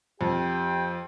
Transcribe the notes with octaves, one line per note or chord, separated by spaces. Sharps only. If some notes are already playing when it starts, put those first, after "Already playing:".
F2 G4 G5